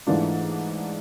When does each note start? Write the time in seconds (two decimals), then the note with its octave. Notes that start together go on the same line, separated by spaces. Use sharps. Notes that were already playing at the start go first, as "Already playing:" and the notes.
0.07 G#2 E3 A3 D4 F4